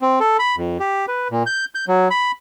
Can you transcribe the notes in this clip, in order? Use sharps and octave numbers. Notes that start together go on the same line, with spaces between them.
C4
A4
B5
F2
G4
B4
A#2
G6
G6
F#3
B5